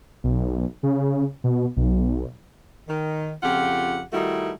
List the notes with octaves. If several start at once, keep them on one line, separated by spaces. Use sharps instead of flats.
B1
C#3
B2
B1
D#3
F2 C#3 F4 G4 F#5
D#3 G3 A3 D#4 E4 F#4